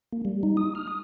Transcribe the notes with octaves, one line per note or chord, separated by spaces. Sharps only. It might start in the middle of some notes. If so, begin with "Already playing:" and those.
A#3
G3
D#4
D#6
F6
D#6